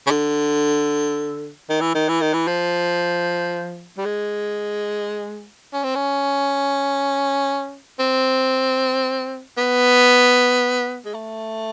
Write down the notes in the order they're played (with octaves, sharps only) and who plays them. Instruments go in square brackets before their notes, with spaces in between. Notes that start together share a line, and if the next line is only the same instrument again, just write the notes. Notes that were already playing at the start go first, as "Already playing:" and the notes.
[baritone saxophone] C#3
D3
D#3
E3
D#3
E3
D#3
E3
F3
G3
G#3
C#4
C4
C#4
C4
B3
G#3
A3